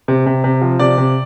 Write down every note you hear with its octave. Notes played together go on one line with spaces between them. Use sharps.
C3
C3
C3
F3
C3 D5
C3